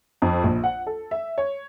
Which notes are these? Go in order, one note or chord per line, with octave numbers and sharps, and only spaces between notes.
F2
A#1
F#5
A4
E5
C#5